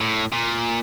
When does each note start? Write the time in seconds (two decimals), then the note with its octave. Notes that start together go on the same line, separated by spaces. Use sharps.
0.01 A2
0.33 A#2